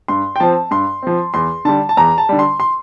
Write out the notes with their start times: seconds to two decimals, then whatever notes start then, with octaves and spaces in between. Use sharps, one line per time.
0.08 G2 C6
0.36 G5
0.40 F3 C4 A5
0.71 G2 C6
1.02 F3 C4
1.34 E2 C6
1.65 D3 G3 A5
1.89 A5
1.97 E2 A#5
2.18 A5
2.29 D3 G3
2.39 C6
2.60 C6